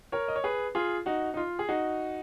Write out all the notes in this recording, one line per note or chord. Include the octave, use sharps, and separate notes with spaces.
A#4 C#5
D#5
C#5
G#4 B4
F4 G#4
D#4 F#4
D#4
F4
G#4
D#4 F#4